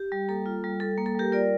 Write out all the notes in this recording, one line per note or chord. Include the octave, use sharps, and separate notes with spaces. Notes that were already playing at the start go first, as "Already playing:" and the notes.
Already playing: G4
G3
A#3 A4
F4
G3
G3 A4
A#3
A4
G3 G4 A#4
F4 A#4 D5